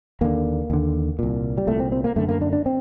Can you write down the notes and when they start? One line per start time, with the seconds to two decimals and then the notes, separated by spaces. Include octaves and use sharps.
0.21 D#2 D3 A#3
0.70 D#2 D3
1.19 C2 A#2
1.58 G3
1.67 C2 A#2 A3
1.80 C4
1.92 C4
2.04 A#3
2.16 F#2 D3 A3
2.29 A#3
2.41 D4
2.53 D4
2.66 C4